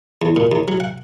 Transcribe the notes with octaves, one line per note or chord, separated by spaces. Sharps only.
E2
A#2
D#2
F#3
F#5